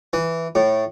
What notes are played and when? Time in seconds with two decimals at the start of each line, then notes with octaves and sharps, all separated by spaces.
0.13 E3
0.55 A2